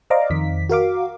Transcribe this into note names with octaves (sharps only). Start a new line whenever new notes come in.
C5 D5 D#5 F5 A#5 D6
F2 D#3 B6
F#4 A#4 F5 D6